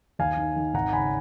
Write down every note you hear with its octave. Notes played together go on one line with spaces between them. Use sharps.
D#2 F5 G#5
D#3
D#3
G#1 F#5 A#5
C#3 G#5 B5